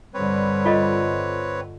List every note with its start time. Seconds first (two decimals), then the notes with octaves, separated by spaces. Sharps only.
0.14 G2 D3 G3 C4 B4 C#5
0.65 F4 A4 D#5